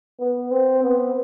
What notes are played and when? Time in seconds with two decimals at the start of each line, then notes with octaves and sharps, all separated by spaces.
0.20 B3
0.51 C4
0.83 B3